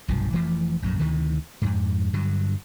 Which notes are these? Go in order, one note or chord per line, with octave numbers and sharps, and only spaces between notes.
F1 B1 G2 F3
F1 E3 F3 A3
A#1 F#2 A2
D2 C3 D#3 E3
F2 G#2
G2 D3 F#3